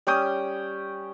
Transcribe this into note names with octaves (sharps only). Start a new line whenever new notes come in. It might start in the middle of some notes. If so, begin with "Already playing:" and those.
G3 C#4 G5 D#6